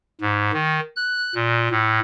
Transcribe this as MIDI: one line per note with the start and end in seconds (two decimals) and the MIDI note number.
0.21 0.51 44
0.53 0.80 51
0.96 1.34 90
1.35 1.68 46
1.71 2.00 45